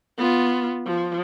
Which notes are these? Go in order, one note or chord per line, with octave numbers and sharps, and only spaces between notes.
B3 F4
F3